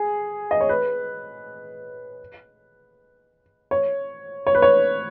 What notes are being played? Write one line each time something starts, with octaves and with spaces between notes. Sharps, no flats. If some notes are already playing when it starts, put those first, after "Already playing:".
Already playing: G#4
D#5
C#5
B4
C#5
C#5
B4
C#5